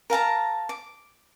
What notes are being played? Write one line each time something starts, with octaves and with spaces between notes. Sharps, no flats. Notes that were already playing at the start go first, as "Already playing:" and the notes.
A#4 F5 A5 A#5
D6